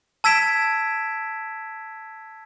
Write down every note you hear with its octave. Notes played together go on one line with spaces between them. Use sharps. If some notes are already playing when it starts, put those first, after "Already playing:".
A5 E6 G#6 B6 D7 E7